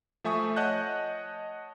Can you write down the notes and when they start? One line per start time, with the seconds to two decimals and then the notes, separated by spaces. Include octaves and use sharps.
0.24 F3 A3 E5 G#5 C#6 D#6
0.56 C#5 D#5 F#5 A5 F#6 G6